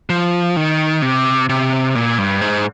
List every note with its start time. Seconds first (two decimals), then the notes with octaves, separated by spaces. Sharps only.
0.10 F3
0.56 D#3
1.02 C3
1.49 C3
1.95 A#2
2.19 G2
2.41 G#2